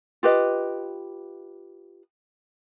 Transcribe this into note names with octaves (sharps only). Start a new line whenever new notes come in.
F4 G4 B4 D#5